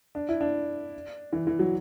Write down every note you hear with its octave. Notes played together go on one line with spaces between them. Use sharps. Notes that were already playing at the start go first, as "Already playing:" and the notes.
D4
E4
D4
E3
E3
F#3